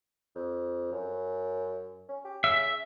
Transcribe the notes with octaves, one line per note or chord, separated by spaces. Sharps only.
F2
F#2
C#4
G4
C#3 E5